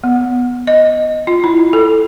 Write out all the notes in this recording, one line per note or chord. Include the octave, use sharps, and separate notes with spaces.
B3
D#5
F4
E4
A4